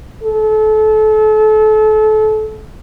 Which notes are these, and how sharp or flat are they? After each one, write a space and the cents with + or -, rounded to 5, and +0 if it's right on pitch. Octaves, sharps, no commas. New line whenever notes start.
A4 -30